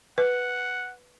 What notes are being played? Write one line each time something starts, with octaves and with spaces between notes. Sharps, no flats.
B4 F#5